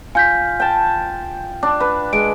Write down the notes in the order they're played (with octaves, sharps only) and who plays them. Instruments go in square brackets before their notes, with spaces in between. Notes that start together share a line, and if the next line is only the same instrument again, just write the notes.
[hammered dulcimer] F4 [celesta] G#5 G6 B6
[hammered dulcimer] G5 A5
[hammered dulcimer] D4 [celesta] D6
[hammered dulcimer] B4
[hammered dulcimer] G#3 [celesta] D7